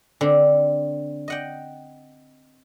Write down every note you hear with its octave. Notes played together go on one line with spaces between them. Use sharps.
D3 C4
D#5 F#5 G5